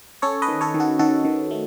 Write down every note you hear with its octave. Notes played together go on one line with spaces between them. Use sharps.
C#4 A4 C#5
B4 D#5
D#3
A4 C#5
D#3
F#4 A4
D#3 F#4 A4
D#3
A3